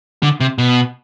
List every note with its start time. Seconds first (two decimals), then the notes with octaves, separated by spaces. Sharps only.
0.23 D3
0.40 C3
0.58 B2